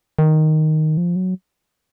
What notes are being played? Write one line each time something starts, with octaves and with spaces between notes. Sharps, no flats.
D#3
F3
F#3